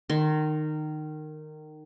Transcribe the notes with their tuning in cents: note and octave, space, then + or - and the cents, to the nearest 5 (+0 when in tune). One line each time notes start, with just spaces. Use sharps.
D#3 -20 C6 +0